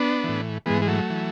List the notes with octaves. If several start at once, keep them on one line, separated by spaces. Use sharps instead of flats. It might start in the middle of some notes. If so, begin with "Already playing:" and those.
Already playing: B3 D4
A2 E3
G#2 E3 G#3 B3
G#3
F#3 A3
E3